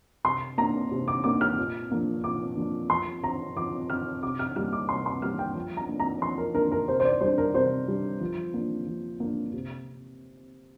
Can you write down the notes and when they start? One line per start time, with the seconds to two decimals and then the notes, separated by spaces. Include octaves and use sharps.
0.24 C3 C6
0.58 A#3 D4 A#5
0.91 C3
1.08 D6
1.24 A#3 D4 D6
1.41 F6
1.58 A#2
1.90 F3 A#3 D4
2.24 A#2 D6
2.57 F3 A#3 D4
2.90 F3 C6
3.23 C4 A#5
3.56 F3 D6
3.90 C4 F6
4.23 C3 D6
4.39 F6
4.56 G3 A#3 F6
4.73 D6
4.89 C3 C6
5.06 C6
5.22 G3 A#3 F6
5.39 G5
5.55 F3
5.77 A#5
5.89 A#3 D4
6.00 A#5
6.21 F3 C6
6.38 A#4
6.54 A#3 D4 A#4
6.72 A#4
6.88 C3 C5
7.00 C5
7.05 D5
7.21 G3 D4 C5
7.38 A#4
7.54 C3 C5
7.88 G3 D4
8.21 F3
8.54 A#3 D4
8.87 F3
9.20 A#3 D4
9.53 C3